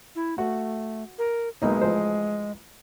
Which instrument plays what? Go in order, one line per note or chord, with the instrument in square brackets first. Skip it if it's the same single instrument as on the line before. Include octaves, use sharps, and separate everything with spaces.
[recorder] E4
[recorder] A3 [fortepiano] F#4
[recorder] A#4
[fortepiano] B1 A#3 D#4 [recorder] G#3
[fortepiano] A1 F3 C5